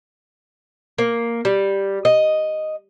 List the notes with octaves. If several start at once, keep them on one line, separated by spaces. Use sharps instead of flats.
A#3
G3
D#5